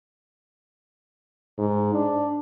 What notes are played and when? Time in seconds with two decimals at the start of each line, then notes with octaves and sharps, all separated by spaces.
1.59 G#2
1.94 D4